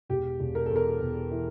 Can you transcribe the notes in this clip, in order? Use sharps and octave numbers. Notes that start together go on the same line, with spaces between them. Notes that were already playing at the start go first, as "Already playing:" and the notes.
E1 G4
E1
A#4
E2 A4
A#4
E1
E3